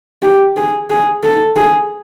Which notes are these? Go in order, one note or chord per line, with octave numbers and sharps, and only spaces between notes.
G4
G#4
G#4
A4
G#4